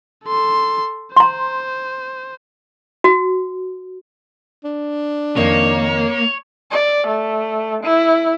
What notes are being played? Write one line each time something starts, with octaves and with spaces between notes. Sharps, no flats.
A4 C6
C5 A#5 C6
F#4
D4
F2 D#3 A#3 D#4 C#5
D5
A3
E4